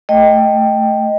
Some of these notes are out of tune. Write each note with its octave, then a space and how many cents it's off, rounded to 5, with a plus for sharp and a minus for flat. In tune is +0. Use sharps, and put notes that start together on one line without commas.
A3 +0 D#5 +0 G5 +0